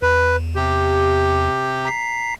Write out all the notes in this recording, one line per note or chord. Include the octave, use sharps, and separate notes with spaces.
E2 B4
C3 G4
A#5 B6 C7